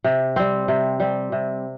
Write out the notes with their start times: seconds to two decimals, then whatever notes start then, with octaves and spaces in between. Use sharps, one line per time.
0.04 C3
0.36 G3 C4
0.68 C3
1.00 G3 C4
1.32 C3